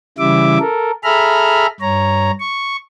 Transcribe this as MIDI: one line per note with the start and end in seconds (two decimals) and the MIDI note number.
0.18 0.58 49
0.18 0.58 52
0.18 0.58 55
0.18 0.58 64
0.18 0.58 76
0.18 0.58 86
0.60 0.91 69
0.60 0.91 70
1.04 1.66 68
1.04 1.66 69
1.04 1.66 76
1.04 1.66 82
1.04 1.66 83
1.04 1.66 89
1.81 2.31 43
1.81 2.31 73
1.81 2.31 82
2.40 2.76 85